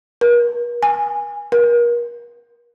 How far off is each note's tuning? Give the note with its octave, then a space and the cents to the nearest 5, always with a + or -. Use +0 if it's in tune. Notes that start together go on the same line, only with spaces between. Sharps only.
A#4 +45
G#5 -15
A#4 +35